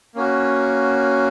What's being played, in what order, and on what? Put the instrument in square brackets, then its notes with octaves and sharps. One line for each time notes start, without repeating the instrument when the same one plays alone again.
[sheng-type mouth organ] A#3 C#4 F#4